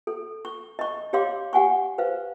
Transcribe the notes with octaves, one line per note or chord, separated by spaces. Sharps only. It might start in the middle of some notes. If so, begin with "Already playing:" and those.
A4
C#6
D#5 C#6
G4 C#5 F5 C6 D6
G4 F#5 G#5 C#6
B4 C5 F5